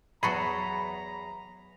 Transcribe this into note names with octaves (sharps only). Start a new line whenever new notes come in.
E2 F#3 F#4 G#4 A4 A#5 B5